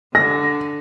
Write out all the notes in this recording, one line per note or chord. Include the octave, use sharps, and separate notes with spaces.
D3 A#6